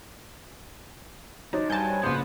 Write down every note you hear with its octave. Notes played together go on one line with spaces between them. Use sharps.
F#3 D4 D#4 C5
G2 G#5 A5 G6
A#1 C#3 B3 B4 C5